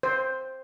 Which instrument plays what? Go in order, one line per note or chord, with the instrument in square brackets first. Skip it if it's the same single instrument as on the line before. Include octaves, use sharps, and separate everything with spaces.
[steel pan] C5